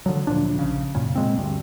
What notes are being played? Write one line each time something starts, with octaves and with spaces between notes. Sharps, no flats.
D3 F3 F#3
D2 A#2 F3 D4
A#1 C#3
F#2 A#2 C#3
A#2 G#3 C4
D2 G2